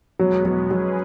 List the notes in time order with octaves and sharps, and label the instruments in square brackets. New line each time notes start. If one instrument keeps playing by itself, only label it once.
[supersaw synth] E2 B2 G#3 B3 [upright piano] F#3
[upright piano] F#3
[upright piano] F#3 [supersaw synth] G#3 C#4 G#4 B4